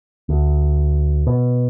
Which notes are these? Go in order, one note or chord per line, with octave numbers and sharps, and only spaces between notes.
D2
B2